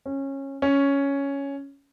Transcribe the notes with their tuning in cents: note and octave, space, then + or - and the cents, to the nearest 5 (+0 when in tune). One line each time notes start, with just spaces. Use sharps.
C#4 -20
C#4 +5